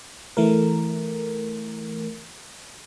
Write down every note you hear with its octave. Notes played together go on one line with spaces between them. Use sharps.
E3 A3 A#4